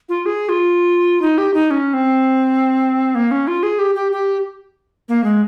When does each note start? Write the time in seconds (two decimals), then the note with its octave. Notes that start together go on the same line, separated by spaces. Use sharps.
0.09 F4
0.26 G#4
0.49 F4
1.22 D#4
1.38 G4
1.54 D#4
1.71 C#4
1.94 C4
3.15 A#3
3.31 C#4
3.47 F4
3.63 G#4
3.79 G4
3.95 G4
4.12 G4
5.09 A#3
5.24 G#3